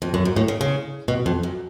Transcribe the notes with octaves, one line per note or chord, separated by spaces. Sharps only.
F2
F#2
G#2
A2
C#3
C#3
B2
F2
F#2